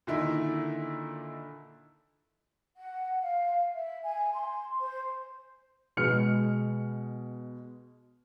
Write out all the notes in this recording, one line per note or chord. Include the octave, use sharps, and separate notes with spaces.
A#2 D3 D#3 E4
F#5
F5
E5
G#5
C6
C5
B2 G#3 F6 C#7